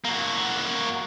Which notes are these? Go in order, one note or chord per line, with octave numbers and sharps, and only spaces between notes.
A#3 F#4